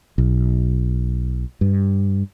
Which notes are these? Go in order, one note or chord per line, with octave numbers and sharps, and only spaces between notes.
B1
G2